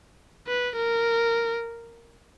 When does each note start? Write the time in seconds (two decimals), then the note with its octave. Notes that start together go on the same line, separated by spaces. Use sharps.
0.47 B4
0.76 A#4